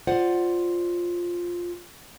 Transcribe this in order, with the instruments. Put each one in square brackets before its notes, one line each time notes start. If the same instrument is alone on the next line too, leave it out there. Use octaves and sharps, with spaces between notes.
[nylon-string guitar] F4 C5 D5 F#5